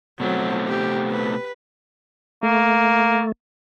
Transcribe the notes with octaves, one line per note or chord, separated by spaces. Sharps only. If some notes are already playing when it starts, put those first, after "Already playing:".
B2 F#3 A3 C4
G4
B4
A3 A#3